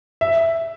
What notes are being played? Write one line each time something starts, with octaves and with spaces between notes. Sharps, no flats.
E5